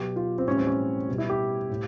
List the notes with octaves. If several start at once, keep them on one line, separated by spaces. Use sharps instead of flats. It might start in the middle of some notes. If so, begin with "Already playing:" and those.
Already playing: B2 F#3 G4
F4
C4
A2 E3 G3 C#4
C4
C#4
B2 G3
E4
G4
A2